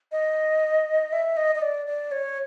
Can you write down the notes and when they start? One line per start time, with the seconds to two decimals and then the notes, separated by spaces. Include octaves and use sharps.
0.12 D#5
1.13 E5
1.37 D#5
1.55 D#5
1.62 D5
1.87 D5
2.11 C#5